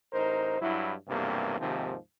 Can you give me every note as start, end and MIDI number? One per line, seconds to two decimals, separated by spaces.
0.13 0.57 33
0.13 0.57 63
0.13 0.57 70
0.13 0.57 72
0.60 0.93 43
0.60 0.93 54
0.60 0.93 64
1.08 1.60 35
1.08 1.60 40
1.08 1.60 43
1.08 1.60 48
1.08 1.60 58
1.60 1.96 39
1.60 1.96 44
1.60 1.96 48
1.60 1.96 51
1.60 1.96 53